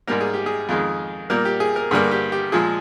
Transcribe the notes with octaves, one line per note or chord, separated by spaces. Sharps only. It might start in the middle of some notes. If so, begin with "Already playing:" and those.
G#2 G3 A#3 A#4
G#4
G4
G#4
F2 D#3 G#3
A#2 G3 A#3 A#4
G4
G#4
A#4
G2 D3 G3 A#3 G#4
G4
G4
A#2 F3 G#3 G#4